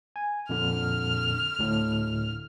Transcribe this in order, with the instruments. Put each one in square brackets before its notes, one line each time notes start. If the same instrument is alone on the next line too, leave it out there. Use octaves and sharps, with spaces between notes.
[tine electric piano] G#5
[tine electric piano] F2 A#2 D3 [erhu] F6
[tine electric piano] D2 A2 D3